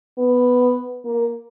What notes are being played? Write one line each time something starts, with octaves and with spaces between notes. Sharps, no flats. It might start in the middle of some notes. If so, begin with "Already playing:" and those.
B3
A#3